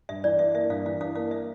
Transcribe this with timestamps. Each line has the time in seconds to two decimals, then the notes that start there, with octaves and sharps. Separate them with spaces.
0.09 G2 E5
0.24 E3 D5
0.39 D4 E5
0.54 A#3 E5
0.70 G2 F5
0.86 E3 F5
1.01 D4 F5
1.15 A#3 F5
1.31 E5